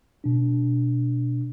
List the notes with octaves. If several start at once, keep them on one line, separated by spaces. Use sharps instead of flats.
B2 D4